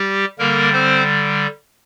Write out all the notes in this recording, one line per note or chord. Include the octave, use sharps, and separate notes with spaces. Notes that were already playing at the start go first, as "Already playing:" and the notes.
Already playing: G3 G4
D3 G3 A#3 A#4
C4 C5